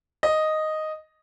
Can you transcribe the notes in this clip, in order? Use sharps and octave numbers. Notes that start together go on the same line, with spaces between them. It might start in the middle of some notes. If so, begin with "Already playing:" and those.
D#5